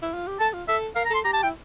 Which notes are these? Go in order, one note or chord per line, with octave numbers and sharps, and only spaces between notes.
E4
F4
G4
A4 A5
F4
A4 E5
A#4 F5
A#5
A4 C6
G4 A#5
A5
E4 G5